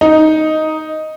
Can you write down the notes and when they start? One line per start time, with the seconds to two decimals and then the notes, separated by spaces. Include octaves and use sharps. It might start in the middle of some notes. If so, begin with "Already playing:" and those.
0.01 D#4